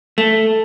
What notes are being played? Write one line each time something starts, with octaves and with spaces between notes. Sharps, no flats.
A3